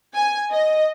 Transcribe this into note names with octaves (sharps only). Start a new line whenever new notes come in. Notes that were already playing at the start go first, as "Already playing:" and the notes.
G#5
D#5